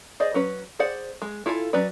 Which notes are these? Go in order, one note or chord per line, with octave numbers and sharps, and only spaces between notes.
G#4 C5 D5 D#5
F#3 C#4 B4
G#4 C5 D5 F#5
G#3
E4 F4 A4 C5 G#5
F#3 C#4 B4 D5